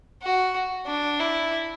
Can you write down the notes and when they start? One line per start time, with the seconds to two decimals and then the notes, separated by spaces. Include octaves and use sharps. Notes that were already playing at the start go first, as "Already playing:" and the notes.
0.23 F#4
0.87 D4
1.20 E4